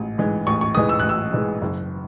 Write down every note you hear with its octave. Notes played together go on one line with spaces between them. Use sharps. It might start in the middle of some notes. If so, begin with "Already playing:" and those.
Already playing: A1 G#2 G#3
G#2 E3 G#3
A1 C#6
C#6
G#2 E3 G#3 D#6
E6
A1 F#6
E6
G#2 E3 G#3
F#1